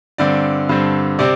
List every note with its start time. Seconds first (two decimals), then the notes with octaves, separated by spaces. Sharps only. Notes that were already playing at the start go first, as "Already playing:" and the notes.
0.18 G2 D3 C4 D5
0.69 G2 D3 C4
1.19 C3 C4 D5